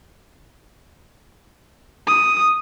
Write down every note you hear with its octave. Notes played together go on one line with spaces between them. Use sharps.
D#6